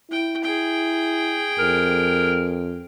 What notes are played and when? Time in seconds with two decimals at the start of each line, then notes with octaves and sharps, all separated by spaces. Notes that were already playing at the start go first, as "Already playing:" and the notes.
0.11 E4 G5
0.43 G#4 G5
1.59 F2 A#4